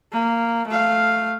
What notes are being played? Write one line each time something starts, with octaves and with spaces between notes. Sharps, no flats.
A#3
A3 F5